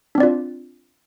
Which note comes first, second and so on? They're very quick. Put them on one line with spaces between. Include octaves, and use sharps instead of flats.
D4 C4 D5 F4